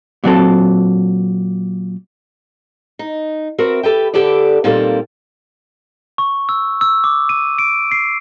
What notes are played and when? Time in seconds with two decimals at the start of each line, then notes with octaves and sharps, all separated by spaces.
0.24 A#2 F#3 C4 A4
2.99 D#4
3.58 C4 F#4 A#4 B4 E5
3.83 G4 A4 B4 G5
4.14 D3 G4 A4 B4 D5
4.64 A#2 D#3 G3 A#3 C4 A4
6.18 C#6
6.49 E6
6.81 E6
7.04 D6
7.29 D#7
7.59 D7
7.91 C7